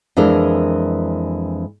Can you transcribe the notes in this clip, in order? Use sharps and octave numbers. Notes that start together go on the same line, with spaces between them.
F2 E3 G#3 D4 A#4